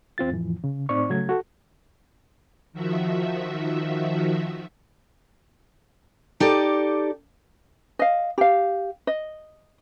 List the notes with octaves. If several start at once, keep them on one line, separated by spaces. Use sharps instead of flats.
E2 C4 F4 A6
F2 A2 E3 F3
C#3
A2 C4 D#4 D5 C#6
C#3 F#3 A3 G#6
F#4 A4
D#3 F3 F#4 E5
D#4 G4 A4 D5
D#5 F5
G4 F5
D#5